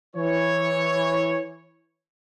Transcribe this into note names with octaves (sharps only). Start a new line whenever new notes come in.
E3 C#5